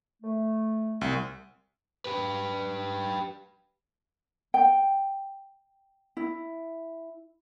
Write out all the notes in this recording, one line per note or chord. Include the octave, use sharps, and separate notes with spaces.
A3
C2
G4 B4
G5
E4